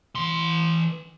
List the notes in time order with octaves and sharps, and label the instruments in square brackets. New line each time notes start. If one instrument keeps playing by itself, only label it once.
[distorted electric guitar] E3 C6